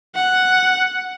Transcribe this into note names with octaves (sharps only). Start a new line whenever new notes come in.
F#5